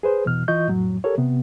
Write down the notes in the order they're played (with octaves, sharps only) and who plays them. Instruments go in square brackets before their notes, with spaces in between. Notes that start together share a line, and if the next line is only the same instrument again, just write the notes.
[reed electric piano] G#4 B4 C5
E2 B2 E3 F6
E3 F4 D#5 C#6 G6
F2 A2 F#3
G4 A4 A#4 C#5
C3 B3